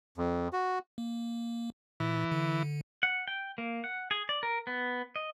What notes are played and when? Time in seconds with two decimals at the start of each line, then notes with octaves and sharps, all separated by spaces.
0.18 F2
0.53 F#4
0.98 A#3
2.00 A#2 E3
2.32 D3
3.03 F#5
3.28 G5
3.58 A#3
3.84 F#5
4.11 G#4
4.29 D5
4.43 A#4
4.67 B3
5.16 D#5